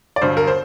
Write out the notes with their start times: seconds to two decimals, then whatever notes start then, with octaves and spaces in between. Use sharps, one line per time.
0.16 D5
0.22 G1 G2 F#3 C5
0.37 A#4
0.47 C5